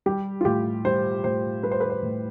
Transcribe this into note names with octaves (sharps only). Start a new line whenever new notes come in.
G3 G4
F4
A2 G4
G3 C5
A2 C5
G3 B4
C5
B4
C5
A2